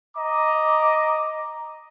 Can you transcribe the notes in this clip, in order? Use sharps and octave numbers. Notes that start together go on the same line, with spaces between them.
D#5 A#5 D6